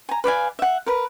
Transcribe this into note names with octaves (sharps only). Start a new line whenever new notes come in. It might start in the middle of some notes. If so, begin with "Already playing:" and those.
G#5 A#5
B4 D5 F5 G#5
E5 F#5
A#4 B4